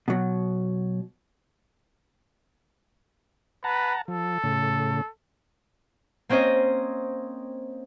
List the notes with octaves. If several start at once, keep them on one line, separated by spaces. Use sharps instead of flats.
B2 F#3
B4 F#5 A5 A#5
F3 A4
A2 C#3
A#3 C4 C#4 C5 D#5